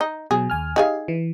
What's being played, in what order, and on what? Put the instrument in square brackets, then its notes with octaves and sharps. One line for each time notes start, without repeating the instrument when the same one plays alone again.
[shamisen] D#4
[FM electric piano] B2 F#3 [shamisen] G#4
[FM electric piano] D#2 G#5 F6
[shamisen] D#4 G#4 F5 [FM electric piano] G4
[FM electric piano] E3